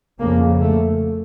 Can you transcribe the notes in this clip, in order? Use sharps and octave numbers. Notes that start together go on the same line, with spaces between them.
F2 C#3 A#3
A3